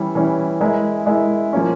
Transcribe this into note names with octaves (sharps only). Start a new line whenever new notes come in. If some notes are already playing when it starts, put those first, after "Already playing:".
Already playing: E3 G3 C#4 E4
E3 G3 C#4 E4
G#3 E4 A#4 E5
G#3 E4 A#4 E5
F3 A#3 C#4